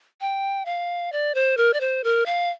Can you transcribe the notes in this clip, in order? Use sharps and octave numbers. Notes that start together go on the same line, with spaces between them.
G5
F5
D5
C5
A#4
D5
C5
A#4
F5